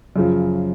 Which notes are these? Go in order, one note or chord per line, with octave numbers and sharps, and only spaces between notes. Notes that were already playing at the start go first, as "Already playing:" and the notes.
F#2 C#3 F3